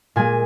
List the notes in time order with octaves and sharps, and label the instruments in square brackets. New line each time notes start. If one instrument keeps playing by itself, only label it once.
[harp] A#2 G#3 G#5